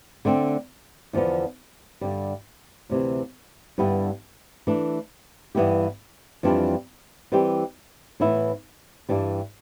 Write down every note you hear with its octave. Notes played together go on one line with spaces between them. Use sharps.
D3 A3 C4
E2 D3 F3 B3
G2 D3 G3
D2 C3 E3
G2 D3 G3 B3 E4
E3 A3 D4
G2 E3 B3 E4 G4
F2 E3 G3 D4 F4
E3 G3 C4 G4
A2 E3 B3 E4
G2 E3 G3 D4